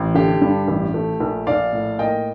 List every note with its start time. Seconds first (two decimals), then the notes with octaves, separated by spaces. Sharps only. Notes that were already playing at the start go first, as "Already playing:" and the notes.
Already playing: A1
0.15 D3 G4
0.41 G2
0.68 A1
0.94 A3
1.20 A#1
1.47 A#1 D5 F5
1.73 A2
1.99 A#3 D#5 G5